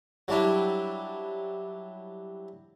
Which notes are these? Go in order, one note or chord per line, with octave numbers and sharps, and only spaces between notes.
F#3 G3 D4 E4